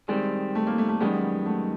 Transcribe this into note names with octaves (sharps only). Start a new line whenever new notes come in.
D#3 G3 G#3 C4
A3
A#3
A3
A3
F#2 D#3 G3 G#3 B3
A3